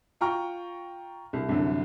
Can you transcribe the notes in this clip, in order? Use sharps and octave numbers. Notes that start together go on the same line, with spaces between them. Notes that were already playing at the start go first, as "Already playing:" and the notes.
F4 G5 A#5 C#6 F6
C2
C2 F#2 D3